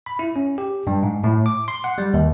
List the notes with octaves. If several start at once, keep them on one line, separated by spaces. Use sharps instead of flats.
B5
E4
C#4
G4
G2
G#2
A2
D6
C6
F#5
G3
D#2